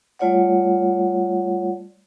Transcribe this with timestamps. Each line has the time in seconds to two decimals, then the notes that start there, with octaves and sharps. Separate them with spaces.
0.19 G3 A3 F4 C#5 D5 F#5